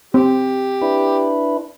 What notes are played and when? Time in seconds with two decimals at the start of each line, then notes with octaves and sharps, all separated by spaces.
0.14 C4 G4
0.82 D4 E4 B4